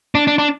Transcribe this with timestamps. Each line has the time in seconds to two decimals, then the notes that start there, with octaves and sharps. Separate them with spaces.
0.15 D4
0.27 D4
0.38 D4